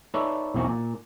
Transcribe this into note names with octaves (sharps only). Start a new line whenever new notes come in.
D#4 A4 B4 C#5 D5 E5
B1 E2 C4 D#4 F#4
A#2